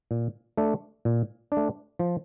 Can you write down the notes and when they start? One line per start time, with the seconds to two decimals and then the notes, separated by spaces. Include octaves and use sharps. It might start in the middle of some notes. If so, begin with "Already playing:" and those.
0.11 A#2
0.58 A3 D4
1.05 A#2
1.52 D4
1.57 A3
1.99 F3